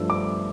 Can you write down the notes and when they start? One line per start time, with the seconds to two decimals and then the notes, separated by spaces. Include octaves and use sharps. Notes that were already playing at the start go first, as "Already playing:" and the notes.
Already playing: G2 F3 A3 D4 E6
0.10 D6